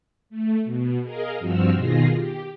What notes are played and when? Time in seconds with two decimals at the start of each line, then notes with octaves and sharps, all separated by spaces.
0.30 A3
0.65 B2
1.03 G#4 A#4 D#5 F5
1.39 G2 F3 C4 F#4 E6 F6
1.73 B2 D#3 F4 G#4 A#6 C7
2.14 G4